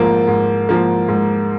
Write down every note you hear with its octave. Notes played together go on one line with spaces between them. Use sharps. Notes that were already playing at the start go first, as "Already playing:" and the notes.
Already playing: G#2 F3 A#3
G#2
F3 A#3
G#2